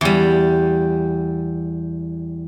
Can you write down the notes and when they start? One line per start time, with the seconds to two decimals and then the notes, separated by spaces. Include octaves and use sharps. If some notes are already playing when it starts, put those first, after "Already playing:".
0.01 E2 G3